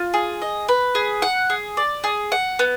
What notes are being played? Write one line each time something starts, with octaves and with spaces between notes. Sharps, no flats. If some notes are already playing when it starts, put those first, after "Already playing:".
Already playing: F4
G#4
D#5
B4
G#4
F#5
G#4
D5
G#4
F#5
B3